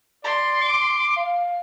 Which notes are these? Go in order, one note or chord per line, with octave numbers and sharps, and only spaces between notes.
D5 C6
D6
F5